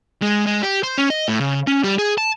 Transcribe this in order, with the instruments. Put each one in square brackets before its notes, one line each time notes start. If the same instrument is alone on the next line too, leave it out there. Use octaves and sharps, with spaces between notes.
[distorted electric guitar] G#3
G#3
G4
C5
C#4
D#5
A2
C#3
C#4
G3
G#4
A5